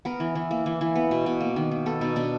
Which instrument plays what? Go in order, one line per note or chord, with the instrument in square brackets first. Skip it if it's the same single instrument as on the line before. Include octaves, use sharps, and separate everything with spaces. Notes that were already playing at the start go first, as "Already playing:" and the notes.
[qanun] B3 A#4
E3
E3
A#3
E3
E3
B3
B2
B2
A#3
D#3
D#3
B3 A4
B2 D#4
B2 D4